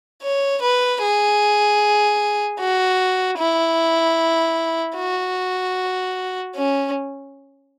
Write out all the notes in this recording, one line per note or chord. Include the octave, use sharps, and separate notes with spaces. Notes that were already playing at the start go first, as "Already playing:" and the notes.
C#5
B4
G#4
F#4
E4
F#4
C#4